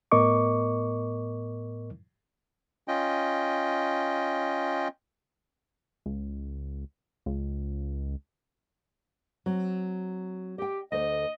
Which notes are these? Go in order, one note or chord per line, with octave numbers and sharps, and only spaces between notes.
A2 B3 A#4 D#5 C#6 D6
C#4 F4 D#5 G5
C#2
C#2
F#3 C4
G4 D#5 G5
D2 C5 D#5